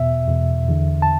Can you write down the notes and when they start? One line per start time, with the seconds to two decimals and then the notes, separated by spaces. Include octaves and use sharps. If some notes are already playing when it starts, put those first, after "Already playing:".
Already playing: E2 B2 E5
0.28 E2 B2
0.69 E2 D3
1.02 A5